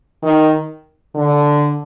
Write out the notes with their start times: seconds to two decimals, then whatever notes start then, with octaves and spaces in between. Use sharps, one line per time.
0.23 D#3
1.15 D3